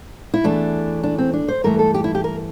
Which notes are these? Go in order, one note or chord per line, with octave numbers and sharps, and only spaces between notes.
E4
E2 E3 A3 D4
D4
C4
D4
C5
G2 E3 A3 A#4
A4
G4
E4
G4
A#4